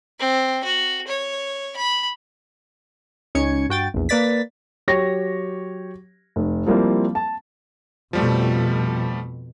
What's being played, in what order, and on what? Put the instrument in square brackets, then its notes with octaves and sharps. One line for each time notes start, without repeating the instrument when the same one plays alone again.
[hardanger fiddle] C4
F#4
C#5
B5
[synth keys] C#2 C#4 D#4 C#5 G#6 C#7
G2 F#4 G5 A6
A#1 E2
A#3 B4 D5 A6 B6
[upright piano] F#3 G4 C#5 C#6 A#6
F1
F3 G3 A#3 C4 E4
A5
[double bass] F2 B2 [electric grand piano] F3 G3 A3